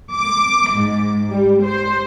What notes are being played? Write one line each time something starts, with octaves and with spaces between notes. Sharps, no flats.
D6
G#2
G3
C5